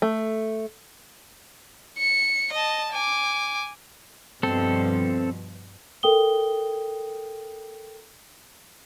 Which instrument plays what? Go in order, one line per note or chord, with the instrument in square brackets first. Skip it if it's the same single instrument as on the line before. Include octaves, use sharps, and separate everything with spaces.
[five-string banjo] A3
[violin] C#7
D#5 A5
G#5 D6
[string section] G2 B2 F3 [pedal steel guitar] C4 A4
[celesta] A4 A#4 G5 D#6 G7